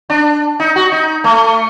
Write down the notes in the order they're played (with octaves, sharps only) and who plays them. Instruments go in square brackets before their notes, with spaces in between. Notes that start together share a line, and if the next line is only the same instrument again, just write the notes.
[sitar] D4
D#4
F#4
D#4
A3